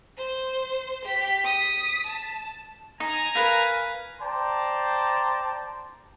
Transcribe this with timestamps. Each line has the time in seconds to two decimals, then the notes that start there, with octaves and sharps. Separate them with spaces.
0.17 C5
1.05 G4 B6
1.44 D#6 B6
2.07 A5
3.00 D#4 G#5 A#5
3.35 A#4 B4 F5
4.20 C5 D5 G5 A5 A#5 C6